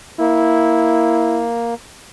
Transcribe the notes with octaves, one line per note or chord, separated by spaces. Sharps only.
A#3 E4